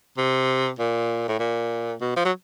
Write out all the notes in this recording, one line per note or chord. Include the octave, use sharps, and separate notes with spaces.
C3
A#2
A2
A#2
B2
F3
F#3